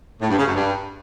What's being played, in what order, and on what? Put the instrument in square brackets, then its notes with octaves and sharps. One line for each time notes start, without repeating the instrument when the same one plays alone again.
[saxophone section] A2
G2
C#3
F#2
G2